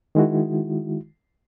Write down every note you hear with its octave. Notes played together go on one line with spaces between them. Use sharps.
D#3 G#3 E4 F#4